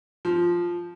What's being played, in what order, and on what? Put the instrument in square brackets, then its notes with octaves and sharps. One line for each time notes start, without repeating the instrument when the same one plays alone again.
[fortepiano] F3